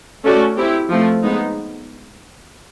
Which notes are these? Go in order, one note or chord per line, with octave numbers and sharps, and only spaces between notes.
A3 C#4 F#4 A4 D5
C4 E4 G4
F3 A3 C4
G#3 B3 D#4